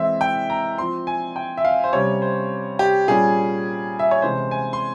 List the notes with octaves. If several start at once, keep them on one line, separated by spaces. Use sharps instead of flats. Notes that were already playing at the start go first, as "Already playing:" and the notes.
Already playing: E3 G#3 C4 E5
G5
A#5
F3 C4 C6
G#5
G5
E5
F5
C5
C3 G3 C#4 C#5
C5
G4
A#2 G3 C#4 G#4
E5
C#5
C3 E3 G#3 C#4 C5
G#5
C6